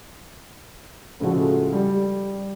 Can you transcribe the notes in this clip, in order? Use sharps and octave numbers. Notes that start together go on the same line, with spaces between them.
A2 C#3 F3 G#3 A3 F#4
G3